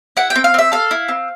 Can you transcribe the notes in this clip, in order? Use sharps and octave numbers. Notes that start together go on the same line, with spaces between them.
E4 F#5
G5
C4
F5
C4 E5
A4 F5
E4
C4